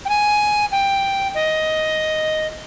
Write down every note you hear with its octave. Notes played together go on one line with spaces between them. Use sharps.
G5
G#5
G5
D#5